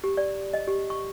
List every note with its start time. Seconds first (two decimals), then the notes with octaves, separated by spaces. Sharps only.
0.04 G4
0.17 D5
0.53 D#5
0.68 G4
0.90 C#6